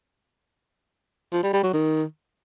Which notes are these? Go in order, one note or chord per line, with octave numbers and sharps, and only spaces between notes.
F3
G3
G3
F#3
D#3